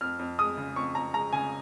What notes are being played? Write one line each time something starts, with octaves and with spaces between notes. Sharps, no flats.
F2 F6
F2
G#3 D#6
C#3
F2 C#6
F2 A#5
G#3 A#5
C#3 G#5